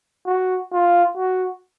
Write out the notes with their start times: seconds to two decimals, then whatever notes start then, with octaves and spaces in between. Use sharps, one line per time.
0.26 F#4
0.72 F4
1.17 F#4